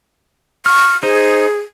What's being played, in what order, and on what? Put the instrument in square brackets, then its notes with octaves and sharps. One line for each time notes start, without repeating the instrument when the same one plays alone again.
[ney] C#6 [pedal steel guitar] F6
[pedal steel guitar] D#4 C5 [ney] G#4